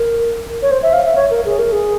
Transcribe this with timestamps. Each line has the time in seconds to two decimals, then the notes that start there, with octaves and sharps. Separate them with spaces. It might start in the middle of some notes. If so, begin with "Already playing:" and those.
Already playing: A#4
0.62 C#5
0.71 C5
0.83 E5
0.93 F5
1.05 E5
1.15 C#5
1.31 A#4
1.45 G#4
1.59 A#4
1.72 G#4